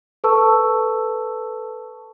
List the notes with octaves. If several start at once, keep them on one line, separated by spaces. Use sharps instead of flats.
A4 B4 A5 C#6 E6